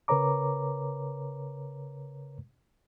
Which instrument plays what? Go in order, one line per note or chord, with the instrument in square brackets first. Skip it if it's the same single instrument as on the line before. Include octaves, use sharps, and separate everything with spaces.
[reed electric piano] C#3 A#4 B4 C#5 A#5 D6